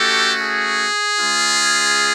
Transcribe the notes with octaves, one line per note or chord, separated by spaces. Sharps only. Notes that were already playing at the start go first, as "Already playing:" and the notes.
Already playing: A3 C#4 F#4 G4 A4
G#4
G#3 C#4 F4